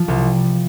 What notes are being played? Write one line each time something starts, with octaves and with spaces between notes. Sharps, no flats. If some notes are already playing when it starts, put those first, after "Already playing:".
Already playing: F3
C2